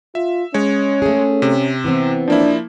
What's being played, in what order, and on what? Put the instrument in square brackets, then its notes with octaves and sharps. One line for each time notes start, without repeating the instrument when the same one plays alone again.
[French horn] F4 [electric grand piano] E5
[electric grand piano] G#3 C#5 [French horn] C#4
[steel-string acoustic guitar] A3 G#4
[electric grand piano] C3
[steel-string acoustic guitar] E3 B3 C4
[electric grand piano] F3 A#3 E4 [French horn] D4